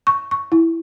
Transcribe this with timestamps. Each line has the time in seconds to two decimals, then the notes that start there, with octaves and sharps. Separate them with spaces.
0.07 C#6
0.31 C#6
0.52 E4